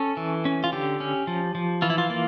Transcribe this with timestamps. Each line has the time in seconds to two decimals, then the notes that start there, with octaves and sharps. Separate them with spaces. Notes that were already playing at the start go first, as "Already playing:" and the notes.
Already playing: C#4 A4
0.17 E3
0.45 C#4
0.64 F4
0.72 D3 G4
1.00 C#4
1.27 F3
1.55 F3
1.82 E3 F4
1.90 E4
1.98 F4
2.10 A#3